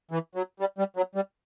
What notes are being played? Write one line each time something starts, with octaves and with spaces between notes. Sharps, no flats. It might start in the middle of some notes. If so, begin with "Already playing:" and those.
E3
F#3
G3
G3
F#3
G3